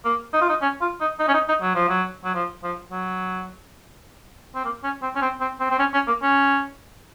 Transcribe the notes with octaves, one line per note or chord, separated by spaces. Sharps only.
A#3
D#4
F4
D#4
C#4
F4
D#4
D#4
C#4
D#4
D#4
F#3
F3
F#3
F#3
F3
F3
F#3
C4
A#3
C#4
C4
C#4
C4
C4
C4
C4
C#4
C#4
A#3
C#4